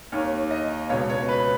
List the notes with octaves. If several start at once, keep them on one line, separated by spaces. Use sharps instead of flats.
D#2 D#3 C#5
D#5
C#2 B2 C#5
C#5
B4